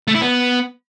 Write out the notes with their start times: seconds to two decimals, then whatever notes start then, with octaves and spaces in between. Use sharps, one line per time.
0.08 A3
0.14 E4
0.21 B3